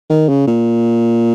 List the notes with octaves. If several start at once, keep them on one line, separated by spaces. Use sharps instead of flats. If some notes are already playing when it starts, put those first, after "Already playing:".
D#3
C#3
A#2